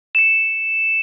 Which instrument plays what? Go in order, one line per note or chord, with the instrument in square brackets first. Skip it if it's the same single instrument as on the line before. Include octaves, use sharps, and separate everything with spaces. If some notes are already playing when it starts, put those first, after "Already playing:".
[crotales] C#7 E7